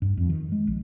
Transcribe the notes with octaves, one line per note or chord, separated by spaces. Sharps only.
G2
F2
D#3
G#3
A#1